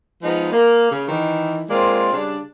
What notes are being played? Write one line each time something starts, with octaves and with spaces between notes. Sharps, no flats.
F3 G#3 B3 D#4
A#3
C#3
D#3 E3
G#3 A#3 C4 F4 D5
C#3 G3 D4